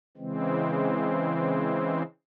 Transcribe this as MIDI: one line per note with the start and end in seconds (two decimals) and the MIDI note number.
0.17 2.03 49
0.17 2.03 52
0.17 2.03 56
0.17 2.03 60